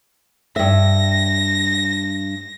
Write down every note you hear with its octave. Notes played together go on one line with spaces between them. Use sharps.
G2 E5 A#6